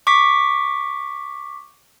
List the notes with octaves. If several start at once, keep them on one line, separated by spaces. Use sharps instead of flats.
C#6 D6 B6